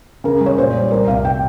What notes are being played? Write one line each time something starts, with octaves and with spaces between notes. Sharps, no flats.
C#3 A#4
G#3
C#5
A#2 C5
G3
C2 A#4
C3 F5
G5